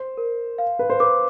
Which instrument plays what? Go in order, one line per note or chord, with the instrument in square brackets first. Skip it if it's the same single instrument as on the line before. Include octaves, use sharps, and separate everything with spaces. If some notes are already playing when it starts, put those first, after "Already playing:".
Already playing: [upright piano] C5
[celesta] A#4
F5
[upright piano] B4
C5
[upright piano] B4 [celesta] D6